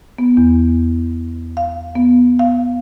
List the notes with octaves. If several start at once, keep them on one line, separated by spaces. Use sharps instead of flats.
B3
E2
F5
B3
F5